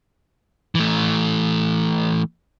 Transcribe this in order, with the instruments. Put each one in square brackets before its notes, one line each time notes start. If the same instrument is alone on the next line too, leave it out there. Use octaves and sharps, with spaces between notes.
[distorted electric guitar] E3 A3